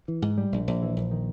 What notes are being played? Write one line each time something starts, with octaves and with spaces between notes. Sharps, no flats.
E3
G#2
G3
A#1
A#1
E3
A#1
D#3